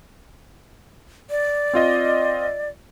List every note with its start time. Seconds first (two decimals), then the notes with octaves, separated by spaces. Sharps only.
1.30 D5
1.73 C4 F4 D#5